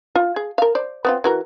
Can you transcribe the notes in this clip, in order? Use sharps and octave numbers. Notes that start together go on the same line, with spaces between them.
F4
G#4
A#4 F5
C5 D5
B3 C4 F4
E3 F#4 A#4